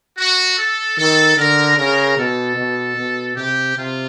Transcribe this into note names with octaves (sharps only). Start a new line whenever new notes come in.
F#4
A4
D#3 A4
D3 A#4
C#3 A#4
B2 A4
B2
B2
C3 G4
C3 F4